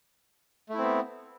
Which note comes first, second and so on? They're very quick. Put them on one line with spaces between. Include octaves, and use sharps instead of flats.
A3 E4 C4 B3